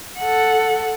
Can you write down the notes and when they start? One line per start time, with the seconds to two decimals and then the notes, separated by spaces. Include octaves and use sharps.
0.19 A4 F#5